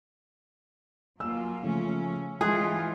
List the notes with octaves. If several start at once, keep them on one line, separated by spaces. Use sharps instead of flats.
F#3 A#3 F4 G#5 E6
C#3 F3 A3 C#4
E3 G#3 F4 G#4 D#5 C6 F#6